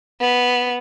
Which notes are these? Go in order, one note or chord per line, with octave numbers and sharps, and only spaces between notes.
B3